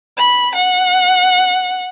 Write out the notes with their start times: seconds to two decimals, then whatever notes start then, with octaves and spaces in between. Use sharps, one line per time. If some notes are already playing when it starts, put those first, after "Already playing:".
0.16 B5
0.54 F#5